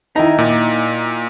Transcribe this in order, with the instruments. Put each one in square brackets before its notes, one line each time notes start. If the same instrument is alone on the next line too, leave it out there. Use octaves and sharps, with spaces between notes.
[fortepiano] D#3 E4 A#5 [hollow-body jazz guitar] D#4
[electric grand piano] A#2